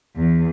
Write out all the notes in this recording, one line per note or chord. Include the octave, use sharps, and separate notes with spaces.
E2